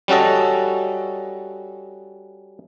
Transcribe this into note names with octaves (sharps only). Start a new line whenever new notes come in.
G3 C#4 F#4 A4 D#5